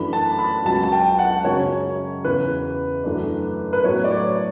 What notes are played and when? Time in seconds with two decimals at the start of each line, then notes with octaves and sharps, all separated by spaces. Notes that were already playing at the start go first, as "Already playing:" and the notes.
Already playing: F#2 E3 A3 D4 B5
0.13 A5
0.39 B5
0.65 C#2 B2 F#3 A5
0.83 A5
0.92 G5
1.19 F#5
1.45 F#2 C#3 F#3 C#4 C#5
2.24 E2 C#3 E3 B4
3.04 F#2 E3 A3 D4
3.73 B4
3.84 A2 F#3 B3 C#5
4.04 D5
4.11 C#5